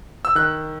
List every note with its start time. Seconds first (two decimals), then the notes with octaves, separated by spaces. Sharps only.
0.25 E6
0.35 D#3 F#6